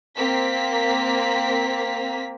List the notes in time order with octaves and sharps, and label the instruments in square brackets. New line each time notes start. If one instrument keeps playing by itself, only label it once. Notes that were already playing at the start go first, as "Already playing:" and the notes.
[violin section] A#3 C4 B6